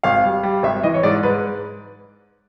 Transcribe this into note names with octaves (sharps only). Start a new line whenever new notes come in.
G#1 F5
G3
G3
G#1 E5
E3 D#5
C#5
G#2 D5
G#2 B4